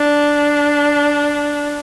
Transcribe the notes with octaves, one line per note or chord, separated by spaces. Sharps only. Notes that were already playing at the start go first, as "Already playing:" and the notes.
Already playing: D4